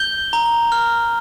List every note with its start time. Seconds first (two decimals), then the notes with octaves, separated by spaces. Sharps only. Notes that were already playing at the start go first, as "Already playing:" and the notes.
Already playing: G6 G7
0.33 A#5
0.72 F6